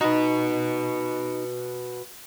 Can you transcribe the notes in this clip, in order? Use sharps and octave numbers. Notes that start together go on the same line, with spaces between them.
D#4 F#4 B4